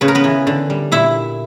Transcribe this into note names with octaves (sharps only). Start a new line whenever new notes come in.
C#3 B4
A#4
B3 B4
E3
D3
G3
A#2 E4 E5